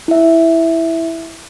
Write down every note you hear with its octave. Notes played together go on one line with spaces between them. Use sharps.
E4 E5